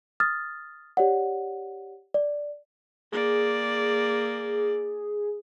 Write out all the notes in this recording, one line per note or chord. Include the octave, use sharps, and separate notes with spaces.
D#6 F6 A6
G4 C#5 D5 F#5
D5
A#3 G#4 D5